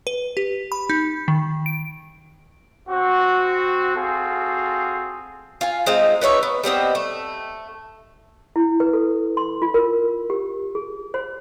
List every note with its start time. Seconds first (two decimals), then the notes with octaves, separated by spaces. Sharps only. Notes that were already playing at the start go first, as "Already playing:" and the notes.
0.07 B4
0.37 G4
0.72 B5
0.90 D#4
1.28 D#3
1.66 D7
2.88 C4 F#4
3.96 C4 F4 F#4 G#4 A4
5.61 F4 G#5
5.86 G#3 C4 D#4 F4
6.21 B3 D#4 C#5 E5
6.43 B3
6.64 G3 B3 C4 D#5
6.95 A3
8.56 E4
8.80 B4
8.93 A4
9.37 C6
9.62 F4
9.74 A#4
10.30 G4
10.75 G#4
11.14 C5